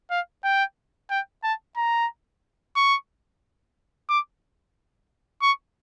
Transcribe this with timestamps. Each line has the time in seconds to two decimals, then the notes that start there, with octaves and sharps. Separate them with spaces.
0.11 F5
0.44 G5
1.10 G5
1.43 A5
1.77 A#5
2.76 C#6
4.09 D6
5.42 C#6